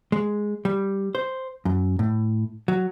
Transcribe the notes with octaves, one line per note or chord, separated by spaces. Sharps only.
G#3
G3
C5
F#2
A2
F#3